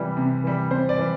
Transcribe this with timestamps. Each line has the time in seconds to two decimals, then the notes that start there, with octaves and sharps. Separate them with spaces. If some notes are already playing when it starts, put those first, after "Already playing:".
Already playing: C3 E3 G3
0.17 C3
0.44 E3 G3
0.71 C3 C5
0.89 D5
0.98 E3 G3